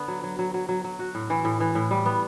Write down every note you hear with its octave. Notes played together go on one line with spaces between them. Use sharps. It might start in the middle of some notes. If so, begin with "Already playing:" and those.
Already playing: D3 B3
F#3
F#3
F#3
F#3
F#3
F#3
F#4
A2
E3
A2
E3
A2
G3
B3